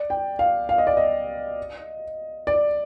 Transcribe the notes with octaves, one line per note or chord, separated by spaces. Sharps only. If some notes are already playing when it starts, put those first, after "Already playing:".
Already playing: D5
G5
F5
F5
D#5
D5
D#5
D5